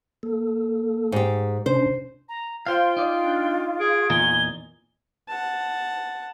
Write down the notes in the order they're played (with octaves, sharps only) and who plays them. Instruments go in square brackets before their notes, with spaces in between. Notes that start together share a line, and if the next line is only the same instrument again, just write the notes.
[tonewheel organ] A#3 A4
[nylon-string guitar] G#2 G4
[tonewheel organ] C3 C#4 D4 [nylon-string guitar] C5
[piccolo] A#5
[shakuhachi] F4 [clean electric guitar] C5 F5 [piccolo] G5
[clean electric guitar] D#4 D5
[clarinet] D4
[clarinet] G#4 [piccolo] D7
[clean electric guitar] E2 A#2 D#4 [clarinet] G#5 [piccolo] G7
[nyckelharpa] F#5 A5